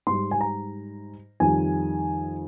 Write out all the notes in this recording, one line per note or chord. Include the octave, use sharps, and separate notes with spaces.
G#2 G3 C6
G#5
A#5
F2 D#3 G3 G#5